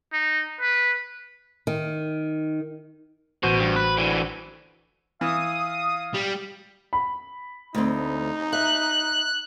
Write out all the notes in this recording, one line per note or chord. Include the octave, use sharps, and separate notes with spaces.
D#4
B4
D#3
A1 B2 F#4 C5
G2
B4
D3 E3
E3 F5 D#6
G3
B5
D2 C4 D#4
E5 F#6